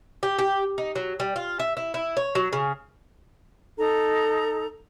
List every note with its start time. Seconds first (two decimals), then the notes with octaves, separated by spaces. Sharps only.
0.23 G4
0.39 G4
0.78 D#4
0.96 F#3
1.20 G3
1.36 F4
1.59 E5
1.77 E4
1.94 E4
2.17 C#5
2.35 F#3
2.53 C#3
3.78 D#4 A4 A#5